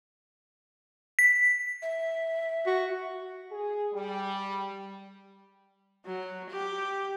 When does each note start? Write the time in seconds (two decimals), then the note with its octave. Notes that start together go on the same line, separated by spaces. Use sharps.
1.19 B6
1.82 E5
2.67 F#4
3.52 G#4
3.93 G3
6.06 F#3
6.49 G4